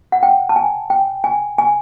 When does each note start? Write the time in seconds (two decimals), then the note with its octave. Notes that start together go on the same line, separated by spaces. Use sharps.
0.12 F#5
0.23 G5
0.49 A5
0.56 G#5
0.90 G5
1.24 G#5
1.58 G#5